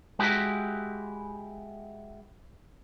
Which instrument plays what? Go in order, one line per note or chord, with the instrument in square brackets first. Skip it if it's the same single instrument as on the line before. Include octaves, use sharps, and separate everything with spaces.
[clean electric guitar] G#3 E4 F#4 G4